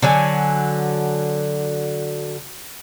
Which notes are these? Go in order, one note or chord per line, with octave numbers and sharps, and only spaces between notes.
D3 F#3 G#5